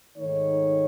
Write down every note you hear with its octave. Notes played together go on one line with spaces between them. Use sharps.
G#2 D#3 A3 D#4 C#5